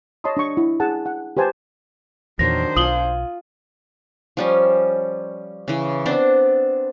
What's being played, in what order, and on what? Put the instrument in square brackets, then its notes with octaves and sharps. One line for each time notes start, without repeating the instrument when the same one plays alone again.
[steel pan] C#5 D#5 A5 B5 C6 D#6
D4 C#6
E4
G#4 F#5 G#5 A5
F#5
G4 B4 C5 G#5 A5
[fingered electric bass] E2 A#2 [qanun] D#3 F#3 A#4 [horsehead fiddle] D4 C5 [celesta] A#6
[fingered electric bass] B1 [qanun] F4 G#5 [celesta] D#6 F#7 G7
[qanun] F3 G3 C#4
C#3 E3
B3 C4 D4 C5